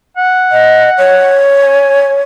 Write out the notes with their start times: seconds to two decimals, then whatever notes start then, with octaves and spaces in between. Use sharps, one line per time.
0.17 F#5
0.52 D#5
0.98 C#5
1.62 G#5